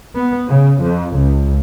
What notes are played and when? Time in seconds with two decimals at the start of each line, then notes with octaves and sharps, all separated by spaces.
0.15 B3
0.48 C#3
0.82 F2
1.16 C#2